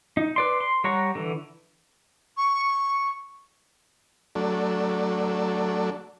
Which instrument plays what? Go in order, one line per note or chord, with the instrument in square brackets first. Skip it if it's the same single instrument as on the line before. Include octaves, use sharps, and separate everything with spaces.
[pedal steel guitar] D#4
B4 D5 C6
C6
G3 C#5 F#5 A#5 C#6
D3 E3
[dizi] C#6
[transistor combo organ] F#3 A3 D4